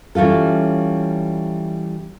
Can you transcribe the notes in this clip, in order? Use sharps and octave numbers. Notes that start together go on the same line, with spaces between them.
E3 G3 C#4 F4 A4